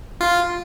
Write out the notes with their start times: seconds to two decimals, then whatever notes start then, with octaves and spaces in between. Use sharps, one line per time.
0.21 F4